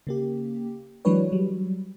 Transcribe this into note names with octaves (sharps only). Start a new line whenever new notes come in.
C#3 A#3 G4
E3 F#3 G#3 D4 B4 C#5
F#3 G3